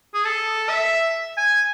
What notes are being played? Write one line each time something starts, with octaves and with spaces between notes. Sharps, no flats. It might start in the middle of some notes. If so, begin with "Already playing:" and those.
G#4
A4
E5
G#5